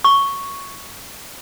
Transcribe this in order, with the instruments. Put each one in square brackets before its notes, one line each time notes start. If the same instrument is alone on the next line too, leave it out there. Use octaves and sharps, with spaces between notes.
[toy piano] C#6